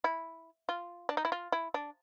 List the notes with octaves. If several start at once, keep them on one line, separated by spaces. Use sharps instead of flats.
E4
F4
D4
D#4
E4
F4
E4
D4